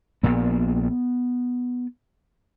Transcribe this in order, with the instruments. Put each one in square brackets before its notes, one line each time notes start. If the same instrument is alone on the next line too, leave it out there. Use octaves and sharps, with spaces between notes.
[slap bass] A#1 A#2 B3